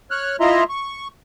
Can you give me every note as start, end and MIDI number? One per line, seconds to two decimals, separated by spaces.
0.11 0.36 73
0.11 0.36 89
0.11 0.36 90
0.40 0.64 64
0.40 0.64 65
0.40 0.64 75
0.40 0.64 76
0.40 0.64 82
0.40 0.64 84
0.69 1.08 85